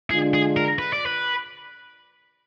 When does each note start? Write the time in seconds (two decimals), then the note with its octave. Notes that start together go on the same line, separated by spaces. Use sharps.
0.10 D3 G#3 D4 F4 G#4
0.34 G#4
0.57 A#4
0.79 B4
0.93 D5
1.06 B4